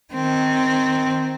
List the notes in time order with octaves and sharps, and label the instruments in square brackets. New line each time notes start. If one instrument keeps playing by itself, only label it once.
[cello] D#3 C4